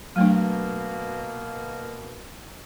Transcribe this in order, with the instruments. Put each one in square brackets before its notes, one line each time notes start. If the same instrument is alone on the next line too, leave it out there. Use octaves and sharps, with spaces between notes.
[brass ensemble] B2 A#3 [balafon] F#3 A3 D4